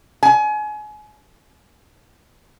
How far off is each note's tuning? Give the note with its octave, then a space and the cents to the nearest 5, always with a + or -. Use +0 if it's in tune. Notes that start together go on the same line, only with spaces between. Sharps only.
G#5 +30